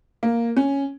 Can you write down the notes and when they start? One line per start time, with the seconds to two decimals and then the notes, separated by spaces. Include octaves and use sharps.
0.23 A#3
0.56 C#4